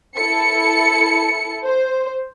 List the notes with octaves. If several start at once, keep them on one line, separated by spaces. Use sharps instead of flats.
E4 A4 C#7
C5